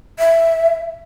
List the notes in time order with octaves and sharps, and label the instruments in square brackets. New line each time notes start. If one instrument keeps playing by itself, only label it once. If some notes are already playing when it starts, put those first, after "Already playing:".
[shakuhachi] E5